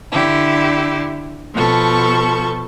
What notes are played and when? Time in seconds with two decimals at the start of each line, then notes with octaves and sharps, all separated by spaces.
0.11 D3 E4 G4
1.53 B2 F3 A4 C#6